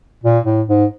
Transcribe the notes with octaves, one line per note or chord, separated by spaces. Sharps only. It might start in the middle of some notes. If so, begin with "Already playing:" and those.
A#2
A2
G#2